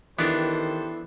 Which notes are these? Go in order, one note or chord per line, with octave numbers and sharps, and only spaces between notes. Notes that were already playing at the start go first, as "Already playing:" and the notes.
D#3 E3 B3 D4 G4 A4 C5